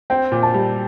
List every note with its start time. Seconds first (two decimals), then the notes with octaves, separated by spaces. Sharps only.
0.10 C4 G5
0.32 A#2
0.43 A5
0.54 G3